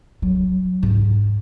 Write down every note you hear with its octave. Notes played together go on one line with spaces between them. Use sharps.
F#3
G#2